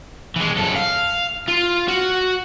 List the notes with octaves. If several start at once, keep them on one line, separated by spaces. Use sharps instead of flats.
E3 G#3
F#2 A4
F5
F4
F#4